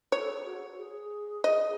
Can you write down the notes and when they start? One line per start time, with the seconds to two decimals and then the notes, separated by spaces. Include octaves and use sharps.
0.12 C#5
0.18 A4
0.29 G#4
0.45 F#4
0.78 G#4
1.44 D#5